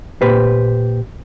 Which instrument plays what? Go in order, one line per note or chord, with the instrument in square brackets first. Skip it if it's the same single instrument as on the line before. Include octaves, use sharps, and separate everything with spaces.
[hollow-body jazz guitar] A#2 G4 B4 C5